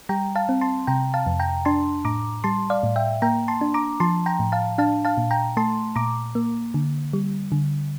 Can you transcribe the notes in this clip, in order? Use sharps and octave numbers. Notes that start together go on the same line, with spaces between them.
G3 G5 A#5
F5 A5
C4
A5 C6
C3 G5 A#5
F5 A5
F2
G5 A#5
D4 A5 C6
A2 A#5 D6
G3 A5 C6
D5 F5
A2
E5 G5
A#3 G5 A#5
A5 C6
D4
A#5 D6
F3 A5 C6
G5 A#5
A2
F5 A5
D4 F5 A5
F5 A5
A#2
G5 A#5
A3 A5 C6
A#2 A#5 D6
A#3
D3
G3
D3